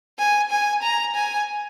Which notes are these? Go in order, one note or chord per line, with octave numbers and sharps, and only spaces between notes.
G#5
G#5
A#5
G#5